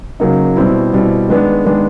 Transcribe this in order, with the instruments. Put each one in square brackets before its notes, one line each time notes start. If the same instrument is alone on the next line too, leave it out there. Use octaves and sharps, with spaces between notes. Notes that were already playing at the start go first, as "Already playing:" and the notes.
[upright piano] C#3 F#3 A#3 D#4
B2 G3 C4 E4
B2 G3 C4 E4
D#3 G#3 B3 D4
D#3 G#3 B3 D4